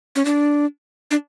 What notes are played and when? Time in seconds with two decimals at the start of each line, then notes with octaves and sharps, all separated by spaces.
0.15 C#4
0.25 D4
1.11 D4